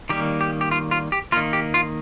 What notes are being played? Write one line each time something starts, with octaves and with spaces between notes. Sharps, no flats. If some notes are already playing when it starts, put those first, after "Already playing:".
D#3 G3 A#3 G4
G4
G4
F4
F4
G4
D#3 A#3 F4
G4
F4